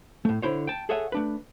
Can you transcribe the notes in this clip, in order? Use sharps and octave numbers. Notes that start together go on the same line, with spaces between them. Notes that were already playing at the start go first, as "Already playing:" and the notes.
A2 A3
D3 E4 C5 C#5
G5 A5
G#4 A4 C#5 E5 F#5 G#5
A3 D4 B4